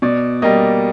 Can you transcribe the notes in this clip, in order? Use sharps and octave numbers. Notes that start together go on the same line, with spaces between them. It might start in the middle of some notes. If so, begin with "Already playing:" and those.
B2 D5
G3 A#3 D#5